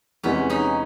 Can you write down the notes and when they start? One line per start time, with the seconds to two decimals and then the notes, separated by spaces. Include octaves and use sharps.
0.23 E2 C3 E3 G#3 B3 C#4
0.50 C#4 D#4